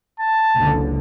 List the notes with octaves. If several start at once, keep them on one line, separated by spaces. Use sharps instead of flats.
A5
F#1 C#2 D3